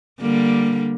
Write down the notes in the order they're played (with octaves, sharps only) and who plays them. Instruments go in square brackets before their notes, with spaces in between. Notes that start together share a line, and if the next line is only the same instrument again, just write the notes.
[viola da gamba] D3 G3 A#3